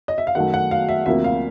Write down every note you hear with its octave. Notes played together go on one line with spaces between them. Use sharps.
D#5
E5
F5
F#2 D#3 F#3 A3 F#5
F#5
F5
E5
D2 C3 F3 A#3 E5
F5